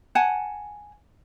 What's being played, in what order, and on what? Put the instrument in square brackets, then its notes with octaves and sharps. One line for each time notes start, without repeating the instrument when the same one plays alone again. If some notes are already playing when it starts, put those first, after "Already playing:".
[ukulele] F#5 G#5 A5